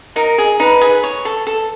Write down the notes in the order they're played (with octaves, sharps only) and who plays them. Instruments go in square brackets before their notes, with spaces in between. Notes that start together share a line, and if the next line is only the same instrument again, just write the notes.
[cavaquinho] D#4 [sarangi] A#4
[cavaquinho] G#4
[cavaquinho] D#4 [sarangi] B4
[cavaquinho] G#4
C#5
A4
A4